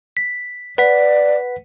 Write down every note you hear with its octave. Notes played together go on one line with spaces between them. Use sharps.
B6
B4 D5 F#5 B6